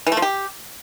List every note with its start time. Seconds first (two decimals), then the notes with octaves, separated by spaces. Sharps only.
0.07 E3
0.12 A3
0.17 F3
0.22 G4